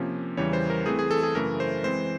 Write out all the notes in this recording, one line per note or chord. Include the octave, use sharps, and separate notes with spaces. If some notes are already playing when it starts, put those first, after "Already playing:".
Already playing: C3 F3 A#3 C#4
E2 C#3 E3 G3 C#5
C5
A#4
E3 A3 C4 G#4
G#4
A4
G#4
F#2 C#3 E3 A3 A#4
C5
E3 G#3 C4 C5